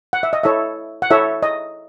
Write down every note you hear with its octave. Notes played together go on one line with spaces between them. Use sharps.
F#5
E5
D#5
E4 A4 C#5 E5
F#5
E4 A4 C#5 E5
D#5